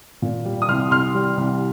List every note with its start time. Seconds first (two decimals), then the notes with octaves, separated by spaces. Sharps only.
0.22 A#2
0.45 G3
0.62 D#6
0.68 C2 C6 F6
0.91 C2 C6 F6
1.15 G3
1.37 C2